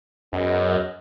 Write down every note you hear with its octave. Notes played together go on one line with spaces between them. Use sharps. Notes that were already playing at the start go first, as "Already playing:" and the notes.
F#2 B3 G#4 D#5